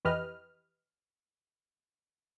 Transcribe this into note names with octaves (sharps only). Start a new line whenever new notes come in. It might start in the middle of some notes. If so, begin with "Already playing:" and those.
F2 E3 G4 B4 D#5 F6